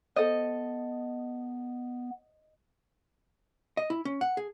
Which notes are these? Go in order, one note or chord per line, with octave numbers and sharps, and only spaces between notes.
B3 A4 C5 D#5
D#5
E4
C#4
F#5
G#4